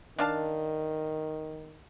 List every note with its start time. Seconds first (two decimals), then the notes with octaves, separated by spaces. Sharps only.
0.18 D#3 D4 F5 A5